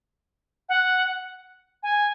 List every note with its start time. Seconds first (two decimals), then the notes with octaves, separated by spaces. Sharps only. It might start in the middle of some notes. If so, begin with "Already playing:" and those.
0.69 F#5
1.83 G#5